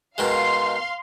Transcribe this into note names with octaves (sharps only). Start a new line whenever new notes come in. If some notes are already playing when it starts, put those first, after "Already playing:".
B2 D#3 G#3 F5 C6